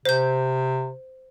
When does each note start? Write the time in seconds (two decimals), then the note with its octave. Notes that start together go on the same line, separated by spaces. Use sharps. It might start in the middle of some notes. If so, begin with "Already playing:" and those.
0.05 C3 C5 G6